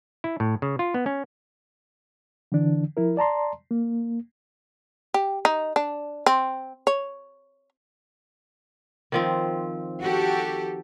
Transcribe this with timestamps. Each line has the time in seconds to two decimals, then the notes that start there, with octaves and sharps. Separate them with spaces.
0.24 E4
0.40 A2
0.62 C#3
0.79 F4
0.94 B3
1.06 C#4
2.52 D3 E3 D4
2.97 F3 E4 A#4
3.17 D5 A5 A#5 C6
3.71 A#3
5.14 G4
5.45 D#4
5.76 D4
6.26 C4
6.87 C#5
9.12 D#3 F3 C4
10.02 F#4 G4 A4